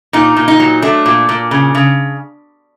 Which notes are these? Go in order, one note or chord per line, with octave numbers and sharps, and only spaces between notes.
A#2 D#4
A#2
D#4
F#3
A3 D4
A#2
A#2
C#3
C#3